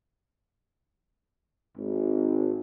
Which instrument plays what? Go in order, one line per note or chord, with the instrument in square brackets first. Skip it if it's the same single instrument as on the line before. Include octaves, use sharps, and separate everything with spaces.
[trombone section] G#1